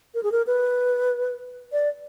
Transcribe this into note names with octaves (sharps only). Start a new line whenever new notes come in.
A#4
G#4
A#4
B4
D5